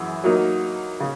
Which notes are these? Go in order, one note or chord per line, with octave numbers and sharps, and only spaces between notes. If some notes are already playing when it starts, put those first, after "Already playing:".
Already playing: F#2 E3 G#4
F#3 A#3 D#4
C#3